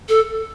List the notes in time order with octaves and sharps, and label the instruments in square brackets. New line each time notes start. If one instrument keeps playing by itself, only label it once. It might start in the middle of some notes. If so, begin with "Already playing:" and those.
[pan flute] A4